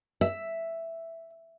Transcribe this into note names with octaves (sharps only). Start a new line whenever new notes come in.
E5